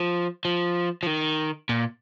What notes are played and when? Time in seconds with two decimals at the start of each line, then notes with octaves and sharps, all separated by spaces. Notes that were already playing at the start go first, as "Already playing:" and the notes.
Already playing: F3
0.45 F3
1.03 F3
1.07 D#3
1.69 A#2